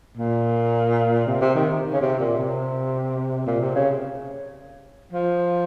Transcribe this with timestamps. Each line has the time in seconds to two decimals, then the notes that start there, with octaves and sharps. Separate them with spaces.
0.17 A#2
1.27 C3
1.41 C3
1.55 D#3
1.93 C#3
2.01 C3
2.19 A#2
2.37 C3
3.47 A#2
3.61 C3
3.75 C#3
5.12 F3